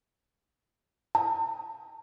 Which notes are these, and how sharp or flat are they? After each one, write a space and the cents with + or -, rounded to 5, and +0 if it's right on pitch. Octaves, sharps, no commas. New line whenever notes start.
A5 +35